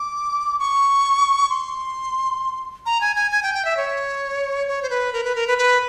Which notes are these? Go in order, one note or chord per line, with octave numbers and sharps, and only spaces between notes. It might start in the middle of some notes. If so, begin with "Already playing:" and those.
Already playing: D6
C#6
C6
A#5
G#5
G#5
G#5
G5
G5
E5
C#5
C#5
C5
B4
A#4
B4
A#4
B4
B4